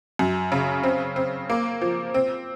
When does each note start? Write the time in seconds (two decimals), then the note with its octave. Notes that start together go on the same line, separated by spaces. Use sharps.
0.19 F#2
0.52 C#3
0.83 C4
1.16 C4
1.50 A#3
1.81 F3
2.14 C4